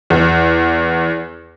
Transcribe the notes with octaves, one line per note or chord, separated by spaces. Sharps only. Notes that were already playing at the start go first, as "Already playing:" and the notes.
E2